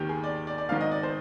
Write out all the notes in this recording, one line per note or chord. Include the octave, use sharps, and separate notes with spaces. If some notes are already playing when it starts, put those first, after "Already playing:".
Already playing: D#2 D#3 G4
G#4
D5
D5
D5
G#1 G#2 D#3 F5
D#5
D5
C5